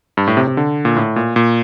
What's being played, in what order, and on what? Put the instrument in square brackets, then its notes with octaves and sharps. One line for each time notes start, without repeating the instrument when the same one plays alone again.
[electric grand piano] G2
A2
C3
C3
D3
A#2
A2
A#2
A#2